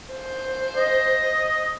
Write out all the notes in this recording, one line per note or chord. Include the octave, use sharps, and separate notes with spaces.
C5
D#5